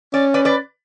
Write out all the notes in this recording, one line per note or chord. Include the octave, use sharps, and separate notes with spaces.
C#4 D5
B4 D5
B4 D5